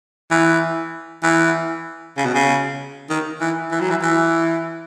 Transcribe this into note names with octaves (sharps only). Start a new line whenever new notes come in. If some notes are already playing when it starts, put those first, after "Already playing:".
E3
E3
C#3
B2
C#3
D#3
E3
E3
F#3
E3
E3